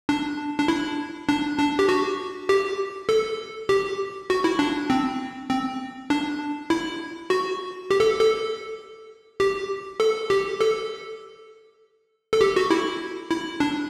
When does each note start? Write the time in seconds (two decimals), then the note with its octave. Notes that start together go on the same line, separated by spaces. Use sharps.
0.09 D4
0.59 D4
0.68 E4
1.29 D4
1.59 D4
1.79 G4
1.89 F#4
2.49 G4
3.09 A4
3.69 G4
4.30 F#4
4.44 E4
4.59 D4
4.90 C4
5.49 C4
6.10 D4
6.70 E4
7.30 F#4
7.91 G4
8.00 A4
8.20 A4
9.40 G4
10.00 A4
10.30 G4
10.61 A4
12.33 A4
12.41 G4
12.56 F#4
12.71 E4
13.30 E4
13.60 D4